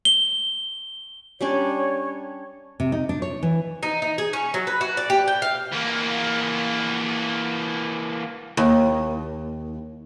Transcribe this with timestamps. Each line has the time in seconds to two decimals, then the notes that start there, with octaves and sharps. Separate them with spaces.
0.05 G7
1.41 G3 C#4 D4 C#5
2.80 C3
2.92 D#4
3.09 D4
3.22 C#5
3.43 E3
3.83 D#4
4.02 D#4
4.18 G#4
4.33 C#4
4.54 F#3
4.67 B4
4.81 F#4
4.97 D5
5.10 G4
5.28 G5
5.42 F5
5.72 E3 A#3
8.57 D#2